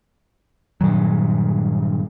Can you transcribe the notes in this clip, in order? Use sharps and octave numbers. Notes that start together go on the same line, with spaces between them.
G2 A#2 D#3 F#3